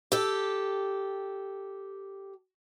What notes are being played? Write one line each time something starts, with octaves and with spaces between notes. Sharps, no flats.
G4 A4